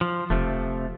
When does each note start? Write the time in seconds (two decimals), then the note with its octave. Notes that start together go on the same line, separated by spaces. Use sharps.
0.01 F3
0.30 E1 C3 F3 A3